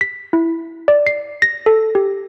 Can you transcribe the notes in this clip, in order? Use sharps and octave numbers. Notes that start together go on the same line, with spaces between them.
B6
E4
D5
C7
A#6
A4
G4